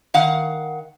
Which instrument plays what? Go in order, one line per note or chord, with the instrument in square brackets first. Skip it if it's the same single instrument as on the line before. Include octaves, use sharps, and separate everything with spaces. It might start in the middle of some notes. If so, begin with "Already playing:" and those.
[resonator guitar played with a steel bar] D#3 F5 F#5